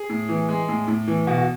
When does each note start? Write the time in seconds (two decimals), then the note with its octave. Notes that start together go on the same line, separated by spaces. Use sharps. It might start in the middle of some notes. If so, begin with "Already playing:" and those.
Already playing: G#4
0.09 A2
0.29 E3
0.49 G#3
0.69 A2
0.88 A2
1.08 E3
1.27 B2 F#4
1.38 F#4